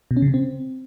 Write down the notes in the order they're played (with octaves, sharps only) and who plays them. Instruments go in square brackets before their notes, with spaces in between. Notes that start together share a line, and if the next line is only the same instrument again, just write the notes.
[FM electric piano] B2
C#4
C#3
C3
C4